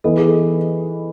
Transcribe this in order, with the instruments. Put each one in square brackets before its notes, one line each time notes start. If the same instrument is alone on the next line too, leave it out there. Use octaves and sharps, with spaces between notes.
[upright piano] E3 B3 E4 B4 D#5 [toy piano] A4
[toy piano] G#4
A4